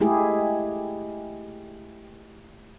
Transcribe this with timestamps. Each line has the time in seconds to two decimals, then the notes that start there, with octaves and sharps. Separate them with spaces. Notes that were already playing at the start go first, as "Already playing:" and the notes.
0.01 G#3 A3 E4 G4 G#4